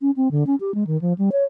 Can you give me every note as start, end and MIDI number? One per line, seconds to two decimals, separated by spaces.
0.01 0.10 61
0.16 0.31 60
0.31 0.44 50
0.47 0.55 61
0.60 0.74 67
0.74 0.84 56
0.87 0.99 51
1.01 1.13 53
1.18 1.30 55
1.32 1.44 73